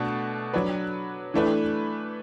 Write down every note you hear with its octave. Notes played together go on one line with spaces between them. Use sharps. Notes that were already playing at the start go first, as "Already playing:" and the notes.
Already playing: B2 A3 D4 F#4 A4
F#3 D4 B4
E3 A3 D4 B4